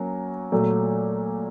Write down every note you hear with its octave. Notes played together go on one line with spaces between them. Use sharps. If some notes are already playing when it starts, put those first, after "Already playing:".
Already playing: F#3 A#3 C#4 F#4
A#2 F#3 A3